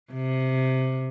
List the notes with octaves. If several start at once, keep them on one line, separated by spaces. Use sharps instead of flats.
C3